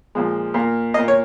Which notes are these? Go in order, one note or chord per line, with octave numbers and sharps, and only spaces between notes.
A#2 F3 G#3
A#2 A#3
A#2 A#3 D#5
C#5